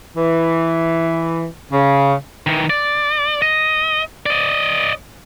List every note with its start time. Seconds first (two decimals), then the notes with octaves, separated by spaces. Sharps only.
0.17 E3
1.72 C#3
2.47 D#3 E3
2.70 D5
3.42 D#5
4.26 D5 D#5